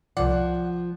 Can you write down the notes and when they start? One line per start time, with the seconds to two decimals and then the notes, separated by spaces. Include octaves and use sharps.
0.17 C2 F3 D5 F#5